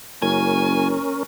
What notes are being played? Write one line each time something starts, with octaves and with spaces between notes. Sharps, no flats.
F#1 C#4 A#4 G#5